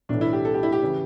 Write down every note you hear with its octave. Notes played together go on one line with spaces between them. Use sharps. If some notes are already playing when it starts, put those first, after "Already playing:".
B1 A2 E3 D4
E4
G4
A4
G4
E4
G4
C#3 E3